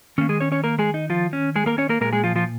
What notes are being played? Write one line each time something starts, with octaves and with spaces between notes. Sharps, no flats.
D#3 A#3 C#4
G#3 G#4
C#4 C#5
C#4 C#5
A#3 A#4
G#3 G#4
D#4
F3 F4
C#4
G#3 G#4
A#3 A#4
C#4 C#5
A#3 A#4
A#2 G#3 A#3 A#4
G#3 G#4
F3 F4
F3 F4